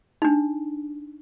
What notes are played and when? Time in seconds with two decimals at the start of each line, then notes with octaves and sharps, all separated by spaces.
0.22 D4 D#4